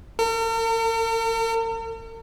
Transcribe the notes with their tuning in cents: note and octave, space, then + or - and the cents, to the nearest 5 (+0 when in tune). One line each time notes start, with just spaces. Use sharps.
A#4 -45